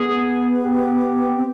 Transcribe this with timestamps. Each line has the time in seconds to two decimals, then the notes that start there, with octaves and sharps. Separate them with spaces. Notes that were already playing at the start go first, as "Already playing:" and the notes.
Already playing: B3 G#4
0.64 G4
1.36 C4